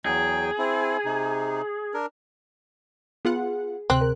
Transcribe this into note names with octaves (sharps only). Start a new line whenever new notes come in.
E2 F#3 G#4 G5
C4 E4
C3 D#4
D4 A#4
B3 F4 G#4 F#5
D2 C3 C4 F#6
A#4